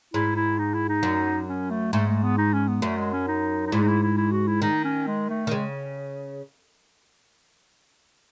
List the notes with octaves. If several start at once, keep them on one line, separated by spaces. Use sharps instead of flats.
G#2 E4
E4
D#4
E4
D#4
F#2
C#4
A3
G#2 A3
A3
B3
D#4
C#4
B3
F#2 A3
G#3
C#4
D#4
D#4
G#2 E4
D#4
E4
E4
E4
F#4
E4
D#3 D#4
C#4
G#3
A3
D#3
C#3 G#3